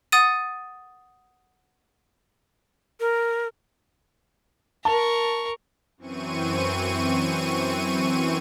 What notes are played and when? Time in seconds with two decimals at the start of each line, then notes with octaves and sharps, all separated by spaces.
0.12 F#5 D#6 A6 D#7
3.00 A#4
4.85 A#4 A5 C#6
5.97 F#2 E3 C4 C#6 D#7